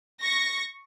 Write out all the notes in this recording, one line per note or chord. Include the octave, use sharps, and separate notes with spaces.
C#6 A#6